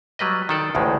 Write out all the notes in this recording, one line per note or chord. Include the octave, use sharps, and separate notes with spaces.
F#3 G3 B4 D#5
D#3 A4 D5
A1 D2 A2 D#3 G#3